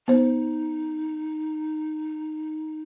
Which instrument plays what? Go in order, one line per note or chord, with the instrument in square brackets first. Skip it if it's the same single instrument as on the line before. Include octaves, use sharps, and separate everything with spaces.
[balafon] B3 C5 [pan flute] D#4